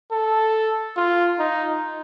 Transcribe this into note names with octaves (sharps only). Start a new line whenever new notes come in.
A4
F4
D#4